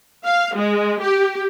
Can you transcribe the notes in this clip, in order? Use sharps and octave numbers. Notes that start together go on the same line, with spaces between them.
F5
G#3
G4